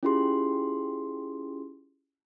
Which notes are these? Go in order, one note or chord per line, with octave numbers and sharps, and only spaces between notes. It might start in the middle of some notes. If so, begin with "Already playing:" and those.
C#4 E4 F4 G4 G#4 C6